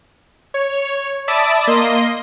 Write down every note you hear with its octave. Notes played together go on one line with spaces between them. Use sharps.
C#5
D5 E5 A5 B5 D6 D#6
A#3 D#5 C6